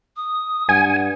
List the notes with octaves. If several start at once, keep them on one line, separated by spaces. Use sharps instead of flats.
D#6
G2 F#5 G#5